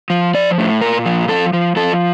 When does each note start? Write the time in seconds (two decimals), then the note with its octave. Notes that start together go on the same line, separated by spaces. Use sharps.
0.10 F3
0.34 F3 D5
0.58 A2
0.81 A#2 A#4
1.05 F3
1.28 F3 A4
1.53 F3
1.76 F3 A4